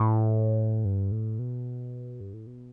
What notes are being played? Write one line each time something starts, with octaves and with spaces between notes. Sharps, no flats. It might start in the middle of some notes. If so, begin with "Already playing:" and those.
Already playing: A2
G2
A2
B2
G2
A2
B2